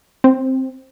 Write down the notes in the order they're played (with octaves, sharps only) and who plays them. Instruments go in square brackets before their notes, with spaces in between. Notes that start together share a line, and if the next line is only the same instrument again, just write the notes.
[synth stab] C4